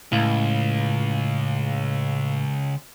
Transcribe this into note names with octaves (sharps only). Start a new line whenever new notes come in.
C#2 A2 F5